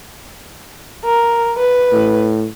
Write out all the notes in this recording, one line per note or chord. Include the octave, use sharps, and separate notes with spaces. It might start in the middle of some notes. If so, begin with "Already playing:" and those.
A#4
B4
A2